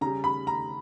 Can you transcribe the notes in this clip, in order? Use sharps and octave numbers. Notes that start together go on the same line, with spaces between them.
C#3 G3 A#5
B5
A#5